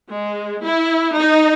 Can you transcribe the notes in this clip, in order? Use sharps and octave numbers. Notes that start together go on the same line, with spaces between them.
G#3
E4
D#4